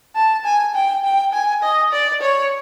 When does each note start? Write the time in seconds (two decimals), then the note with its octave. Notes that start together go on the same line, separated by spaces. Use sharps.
0.15 A5
0.45 G#5
0.75 G5
1.04 G5
1.33 G#5
1.63 D#5
1.92 D5
2.22 C#5